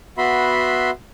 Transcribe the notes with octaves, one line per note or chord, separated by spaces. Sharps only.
B3 F#4 E5 B5 C6